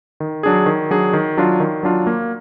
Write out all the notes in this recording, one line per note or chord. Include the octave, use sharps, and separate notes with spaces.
D#3
F#3 D4 G#4
D#3
F#3 D4 G#4
D#3
F#3 D4 F4
D#3
F#3 D4 F4
A#3